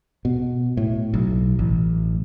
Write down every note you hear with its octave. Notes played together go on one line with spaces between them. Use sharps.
B2
A2
B1
A1